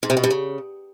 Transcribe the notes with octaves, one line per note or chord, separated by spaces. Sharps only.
G#2
C3
B2
G2
C#3